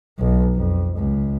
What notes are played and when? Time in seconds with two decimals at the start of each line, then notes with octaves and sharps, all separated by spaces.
0.19 B1
0.55 F2
0.97 C#2